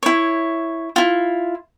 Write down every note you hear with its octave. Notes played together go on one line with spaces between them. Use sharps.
E4 C#5
E4 F4